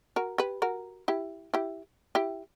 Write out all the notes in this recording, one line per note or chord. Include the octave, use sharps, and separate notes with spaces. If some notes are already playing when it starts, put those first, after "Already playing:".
F#4 A#4
G4 B4
F#4 A#4
E4 G4
E4 G4
E4 G4